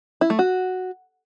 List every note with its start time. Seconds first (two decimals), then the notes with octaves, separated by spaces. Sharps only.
0.21 E4
0.30 A3
0.39 F#4